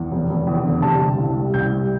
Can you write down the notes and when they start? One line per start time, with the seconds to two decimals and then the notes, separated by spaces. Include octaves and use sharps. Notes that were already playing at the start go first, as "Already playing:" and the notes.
Already playing: E2
0.11 F1
0.29 F1
0.47 E2
0.64 D3
0.82 C3 A5
1.00 G3
1.18 C2
1.36 G3
1.54 C2 G6
1.71 G3